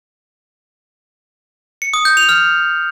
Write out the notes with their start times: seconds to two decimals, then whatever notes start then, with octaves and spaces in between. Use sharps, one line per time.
1.82 C#7
1.94 D#6
2.05 G6
2.17 F7
2.29 F6